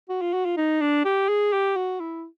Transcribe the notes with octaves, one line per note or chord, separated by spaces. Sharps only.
F#4
F4
F#4
F4
D#4
D4
G4
G#4
G4
F#4
E4